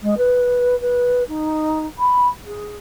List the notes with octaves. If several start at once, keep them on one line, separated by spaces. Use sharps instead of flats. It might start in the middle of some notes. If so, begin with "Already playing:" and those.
G#3
B4
B4
D#4
B5
G#4